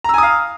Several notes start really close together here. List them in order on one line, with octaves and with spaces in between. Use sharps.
A#5 E6 G#5 D#6 F5